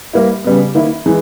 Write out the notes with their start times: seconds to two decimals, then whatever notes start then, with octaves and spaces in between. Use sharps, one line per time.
0.13 G3 A#3 E4
0.44 C#3 G3 B3
0.75 D#3 A#3 E4
1.06 E3 G#3